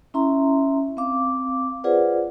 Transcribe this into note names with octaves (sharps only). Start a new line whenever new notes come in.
C#4 E4 E5 A#5 C6
C4 F5 D6
F4 G#4 B4 C5 D5 F#5